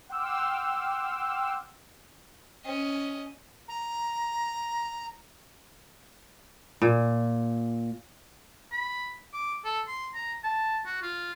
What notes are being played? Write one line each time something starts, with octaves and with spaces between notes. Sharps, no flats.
F#5 G5 C6 D6 E6 F6
C#4 D#5
A#5
A#2
B5
D6
A4
C6
A#5
A5
F#4
F4